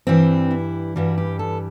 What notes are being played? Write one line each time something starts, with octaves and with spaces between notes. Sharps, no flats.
G2 E3 G3 C4
E4
G2 E3 G3 F#4
G4
A4